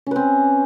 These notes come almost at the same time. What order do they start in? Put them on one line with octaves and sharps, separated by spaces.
C#4 B4 C4